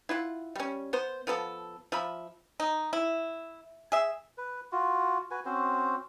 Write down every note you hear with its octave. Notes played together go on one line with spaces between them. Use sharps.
E4 F4 F#5
G3 C#4
B3 C5
F3 B3 A4 A5
F3 E5 B5
D#4
E4
G#4 E5
B4
F4 F#4
F#4 B4 G#5
C4 C#4 F#4 C5